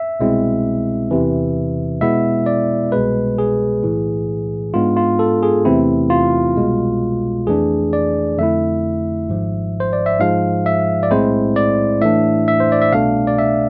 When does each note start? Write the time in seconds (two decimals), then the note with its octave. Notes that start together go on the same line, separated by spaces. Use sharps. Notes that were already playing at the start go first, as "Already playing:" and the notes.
Already playing: E5
0.20 C2 B2 G#3 C4 E4
1.11 E2 C3 E3
2.01 B2 G#3 B3 E4 E5
2.46 D5
2.92 C2 B2 G#3 B4
3.38 G#4
3.83 B1 A2 E3
4.74 G#2 G#3 B3 D4 F4
4.97 F4
5.19 A4
5.43 G#4
5.65 E2 C3 E3 A3 C4 E4
6.10 F4
6.57 C2 B2 G#3
7.47 F2 E3 A3 D4 G#4
7.93 D5
8.38 F2 D3 A3 E4 E5
9.29 G#1 G#2 F3
9.80 C5
9.93 D5
10.06 E5
10.19 G#2 F3 G#3 F5
10.66 E5
11.03 D5
11.11 B1 A2 G#3 C4 E4 C5
11.56 D5
12.01 A2 E3 A3 D4 E5
12.48 E5
12.60 C5
12.72 D5
12.82 E5
12.93 C2 B2 A3 D4 F5
13.27 D5
13.38 E5